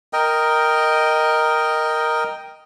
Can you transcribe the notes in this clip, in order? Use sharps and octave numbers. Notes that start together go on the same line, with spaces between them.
A#4 D#5 G5